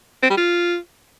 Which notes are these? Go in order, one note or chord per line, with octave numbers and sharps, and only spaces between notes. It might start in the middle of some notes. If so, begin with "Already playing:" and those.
C4
G3
F4